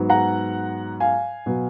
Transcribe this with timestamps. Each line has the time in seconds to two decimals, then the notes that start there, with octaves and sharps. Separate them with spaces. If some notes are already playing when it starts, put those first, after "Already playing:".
Already playing: G#2 F#3 B3
0.10 F#5 A#5
1.00 F5 G#5
1.46 B2 F#3 B3